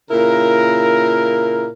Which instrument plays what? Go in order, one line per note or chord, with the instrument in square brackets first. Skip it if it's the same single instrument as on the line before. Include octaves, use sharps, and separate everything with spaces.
[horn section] A#2 C#3 E4 A#4